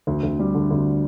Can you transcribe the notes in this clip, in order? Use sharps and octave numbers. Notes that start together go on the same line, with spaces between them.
D2
D2
G3
D3
D2